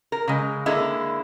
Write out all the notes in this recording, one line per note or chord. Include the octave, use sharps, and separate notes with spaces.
A#4
C#3 G#3
D3 G#3 A#3 E4